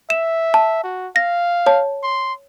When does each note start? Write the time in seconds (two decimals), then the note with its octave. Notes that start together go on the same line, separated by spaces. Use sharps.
0.10 E5 E7
0.54 A5
0.84 F#4
1.16 F5 A#6
1.66 C#5 A5
2.03 C6